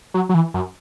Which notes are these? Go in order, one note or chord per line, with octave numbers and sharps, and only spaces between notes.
F#3
F#3
E3
F#2